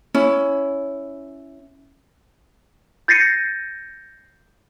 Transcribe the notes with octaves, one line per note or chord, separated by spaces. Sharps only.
C#4 E4
G6 A6 A#6 C7 C#7 D#7